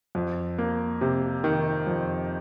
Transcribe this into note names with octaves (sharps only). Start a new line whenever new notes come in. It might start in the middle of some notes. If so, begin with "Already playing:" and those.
F2
A#3
C3
D#3
F2